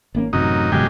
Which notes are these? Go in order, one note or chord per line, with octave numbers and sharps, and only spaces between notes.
G#1 A#3 C#4
A1 F#2 C3 D#4
G1 F#2 B2 E3 G#3 G4